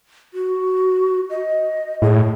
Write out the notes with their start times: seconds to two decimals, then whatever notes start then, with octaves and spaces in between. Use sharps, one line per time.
0.34 F#4
1.30 D#5
2.02 A2 G#4